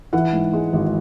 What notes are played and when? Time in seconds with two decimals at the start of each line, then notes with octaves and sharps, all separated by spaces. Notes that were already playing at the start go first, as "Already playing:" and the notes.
0.13 E3 F#5
0.33 G#2
0.53 G#3
0.73 G#1